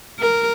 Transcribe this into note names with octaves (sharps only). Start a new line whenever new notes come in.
A#4